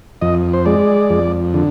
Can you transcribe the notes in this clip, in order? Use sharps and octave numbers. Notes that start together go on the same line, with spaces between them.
F2 D#5
C5
G#3 D5
F2
D3